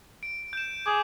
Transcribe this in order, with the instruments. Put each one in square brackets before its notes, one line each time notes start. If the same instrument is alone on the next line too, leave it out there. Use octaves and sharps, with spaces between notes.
[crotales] D7
G6 E7
[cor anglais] G#4 [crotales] D6